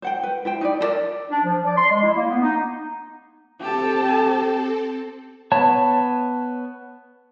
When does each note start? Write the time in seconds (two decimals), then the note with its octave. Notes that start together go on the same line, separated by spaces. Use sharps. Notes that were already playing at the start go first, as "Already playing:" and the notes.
0.02 C5 F#5 G5
0.23 B4
0.45 E4 C5 G5
0.61 D#4 B4 D5
0.81 A4 A#4 D5 E5
1.30 D4
1.44 F3
1.65 D5
1.77 C6
1.90 G#3
2.03 E4
2.16 A#3
2.29 B3
2.43 D#4
3.61 C4 G4 A4 A5
5.52 B3 C#5 A5